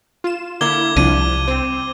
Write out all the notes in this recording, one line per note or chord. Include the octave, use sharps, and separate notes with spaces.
F4 E7
D3 A#3 E4 D6 G#6 G7
C2 F3 D4 D#7
C4